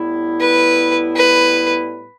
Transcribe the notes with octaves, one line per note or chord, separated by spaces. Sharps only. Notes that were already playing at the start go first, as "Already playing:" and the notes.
Already playing: A2 G3 B3 E4
B4
B4